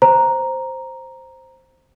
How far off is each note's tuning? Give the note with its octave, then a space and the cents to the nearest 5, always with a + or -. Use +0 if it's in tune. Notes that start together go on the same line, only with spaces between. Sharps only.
C5 +0 A#5 +0